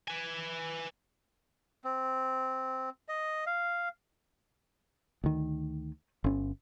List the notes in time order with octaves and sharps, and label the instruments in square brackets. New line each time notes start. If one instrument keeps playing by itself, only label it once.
[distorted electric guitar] B4 G#5
[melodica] C4
D#5
F5
[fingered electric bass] D2 D#3
G1 C#4